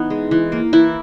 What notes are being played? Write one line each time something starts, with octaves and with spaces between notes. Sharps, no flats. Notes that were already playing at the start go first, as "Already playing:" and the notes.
Already playing: E3 B3 D#4
G#3
E3
A#3
E3 E4